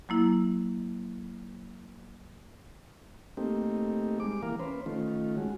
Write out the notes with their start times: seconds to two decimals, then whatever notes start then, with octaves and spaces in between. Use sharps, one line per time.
0.09 F#3 A#3 E4
3.37 A3 A#3 C4 D#4 G4
4.20 G3 G#3 D6
4.43 E3 A#3 A#4 F5
4.59 C#4 B4 C5
4.86 D#3 A3 C#4 F4
5.37 G#3 F#4